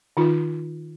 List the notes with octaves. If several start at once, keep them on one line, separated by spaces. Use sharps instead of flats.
D#3 D#4 F4